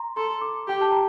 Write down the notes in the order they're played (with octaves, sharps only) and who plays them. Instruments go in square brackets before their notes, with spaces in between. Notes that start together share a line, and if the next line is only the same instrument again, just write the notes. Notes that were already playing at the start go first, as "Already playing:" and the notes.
Already playing: [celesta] A#5 C6
[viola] A4 [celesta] C6
[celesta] D6
[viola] G4 [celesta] G5
[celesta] A5
A#5